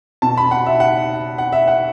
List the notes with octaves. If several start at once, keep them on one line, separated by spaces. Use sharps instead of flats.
B2 A5
B5
F#5
E5
F#5
F#5
E5
F#5